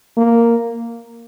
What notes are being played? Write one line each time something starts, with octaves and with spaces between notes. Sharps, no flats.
A#3